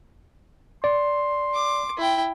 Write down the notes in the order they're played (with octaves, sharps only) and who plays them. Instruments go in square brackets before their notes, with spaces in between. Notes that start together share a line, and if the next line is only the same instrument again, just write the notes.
[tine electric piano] D5 [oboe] C6
[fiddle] D6
E4 G5